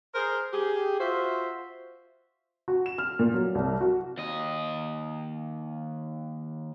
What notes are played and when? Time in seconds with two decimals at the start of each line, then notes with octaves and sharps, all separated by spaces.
0.15 G#4 A#4 C5
0.53 G4 G#4
1.00 F4 F#4 C5 E5
2.68 F#4
2.86 E7
2.98 F6
3.19 A#2
3.34 F#3
3.55 C2
3.81 F#4
4.18 D#2 D#5